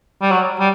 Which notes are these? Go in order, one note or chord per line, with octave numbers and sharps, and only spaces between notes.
G3
F#3
G3